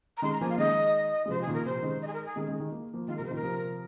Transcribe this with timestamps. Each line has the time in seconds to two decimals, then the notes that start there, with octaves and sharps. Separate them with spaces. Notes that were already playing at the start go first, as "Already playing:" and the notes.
0.17 A#5
0.22 D#3 G#3 C6
0.31 A#5
0.40 F3 A#3 G#5
0.50 F5
0.58 D#3 G#3 D#5
1.26 G#3
1.29 C3 F3 C5
1.41 G#4
1.47 A#2 D#3
1.54 A#4
1.65 C3 F3 C5
1.83 D#3 G#3
2.01 D#5
2.07 G#4
2.13 A#4
2.25 G#4
2.36 D#3 G#3
2.48 D#3 G#3
2.60 D#3 G#3
2.72 A#3
2.94 F3 A#3
3.07 D#3 G#3 F4
3.16 C3 F3 A#4
3.26 C5
3.31 A#2 D#3 A#4
3.43 C3 F3